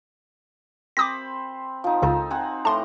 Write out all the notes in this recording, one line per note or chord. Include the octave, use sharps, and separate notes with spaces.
C4 C5 B5 D6 D#6 A#6
F3 D#4
C#2 C#3 D#4 F4 A4
C4 F#5 G#5
A2 E3 A5 A#5 C6